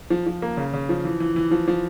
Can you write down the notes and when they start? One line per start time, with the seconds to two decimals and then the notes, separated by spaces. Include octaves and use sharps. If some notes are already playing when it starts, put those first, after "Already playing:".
0.10 F3
0.27 F3
0.42 A#3
0.57 C#3
0.74 C#3
0.89 F3
1.05 E3
1.20 E3
1.36 E3
1.51 F3
1.68 F3